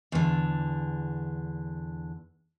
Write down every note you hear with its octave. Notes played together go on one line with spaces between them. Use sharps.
E2 D3